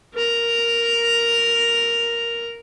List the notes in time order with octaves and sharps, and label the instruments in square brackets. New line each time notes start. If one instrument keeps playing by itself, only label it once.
[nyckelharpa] A#4 A#5